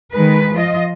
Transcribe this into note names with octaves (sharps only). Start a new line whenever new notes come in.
D#3 G#3 B4
F3 F4 D#5